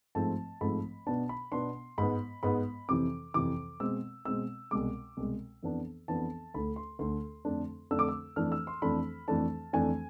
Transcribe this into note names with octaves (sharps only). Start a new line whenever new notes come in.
G#2 F3 A3 C4 A5
G#2 F3 A3 C4 B5
B2 B3 D4 A5
B5
B2 B3 D4 C6
G#2 G#3 B3 B5
G#2 G#3 B3 B5
F2 C3 E3 D6
F2 C3 E3 D6
B2 G#3 C4 E6
B2 G#3 C4 E6
C2 B2 G#3 D6
C2 B2 G#3
F2 E3 B3 D4
F2 E3 B3 D4 A5
D2 D3 A3 B5
C6
D2 D3 A3 C6
F2 D3 A3 D4
F2 D3 A3 D4 E6
D6
E6
F2 E3 A3 D4 F6
E6
C6
F2 E3 A3 D4 B5
F2 E3 A3 D4 A5
F2 E3 A3 D4 G#5